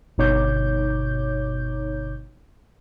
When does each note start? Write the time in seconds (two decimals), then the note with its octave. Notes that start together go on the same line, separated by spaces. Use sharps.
0.18 G1 B2 D#4 C#5 D6 G6